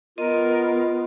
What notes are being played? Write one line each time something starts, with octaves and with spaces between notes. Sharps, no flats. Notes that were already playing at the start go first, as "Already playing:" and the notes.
B3 F4 A#4 D#5